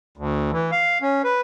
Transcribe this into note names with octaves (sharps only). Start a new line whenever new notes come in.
D2
E3
F5
C#4
B4